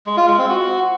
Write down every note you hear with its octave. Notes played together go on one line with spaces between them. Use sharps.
G#3
F4
G#3
C4
F#4